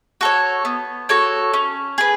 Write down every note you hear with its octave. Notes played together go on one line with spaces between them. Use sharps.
F#4 A4 C#5
B3
F#4 A4 C#5
C#4
G#4 B4